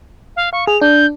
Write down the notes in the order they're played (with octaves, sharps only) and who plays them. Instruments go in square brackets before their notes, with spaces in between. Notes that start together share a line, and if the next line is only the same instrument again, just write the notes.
[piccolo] F5
[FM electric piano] F5 [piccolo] C#6
[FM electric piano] G#4 [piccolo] F7
[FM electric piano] D4 [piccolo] G6